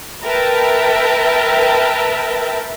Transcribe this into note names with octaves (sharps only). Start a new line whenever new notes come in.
A#4 B4 E5 G5 A5